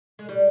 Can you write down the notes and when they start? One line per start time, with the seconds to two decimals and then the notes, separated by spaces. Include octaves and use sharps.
0.19 G#3
0.29 G3